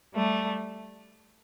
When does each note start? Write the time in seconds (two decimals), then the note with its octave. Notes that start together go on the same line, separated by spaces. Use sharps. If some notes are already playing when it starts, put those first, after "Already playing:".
0.15 G3 A3